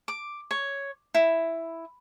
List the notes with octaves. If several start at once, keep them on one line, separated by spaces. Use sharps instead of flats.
D6
C#5
E4